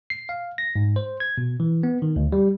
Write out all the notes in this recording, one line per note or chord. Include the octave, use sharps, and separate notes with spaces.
C7
F5
A#6
G#2
C5
G#6
B2
E3
B3
D#3
D2
G3